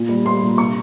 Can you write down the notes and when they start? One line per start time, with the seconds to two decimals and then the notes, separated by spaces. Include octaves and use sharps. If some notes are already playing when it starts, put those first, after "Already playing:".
Already playing: A#2
0.09 G3
0.25 G3 C6
0.43 A#2
0.58 C3 C#6